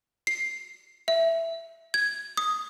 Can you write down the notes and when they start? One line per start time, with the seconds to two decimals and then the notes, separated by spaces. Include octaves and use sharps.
0.27 C7
1.08 E5
1.94 G#6
2.37 D#6